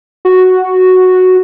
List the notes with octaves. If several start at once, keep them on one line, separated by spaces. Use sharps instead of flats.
F#4